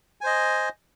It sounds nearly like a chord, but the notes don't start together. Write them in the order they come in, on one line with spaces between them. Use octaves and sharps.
G#5 C5 D#5